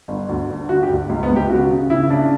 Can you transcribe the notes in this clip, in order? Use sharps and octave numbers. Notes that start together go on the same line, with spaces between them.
G1
D2
D3
D3 F#4
G4
D2
C#2
B3
C#2
G4
C#3 F#4
C#3
C#3 E4
C#3 D4